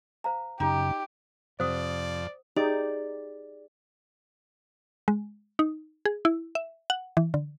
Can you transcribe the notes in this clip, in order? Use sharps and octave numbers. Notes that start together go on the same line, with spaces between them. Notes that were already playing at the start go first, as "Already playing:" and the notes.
C5 F5 A#5
F#2 C#3 D#4 G4
F2 C3 C5 D5 F#5 D#6
D#4 G4 G#4 D5
G#3
D#4
G#4
E4
E5
F#5
E3
D3